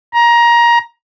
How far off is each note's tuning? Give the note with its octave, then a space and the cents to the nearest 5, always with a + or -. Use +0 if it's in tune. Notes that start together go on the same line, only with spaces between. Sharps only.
A#5 +20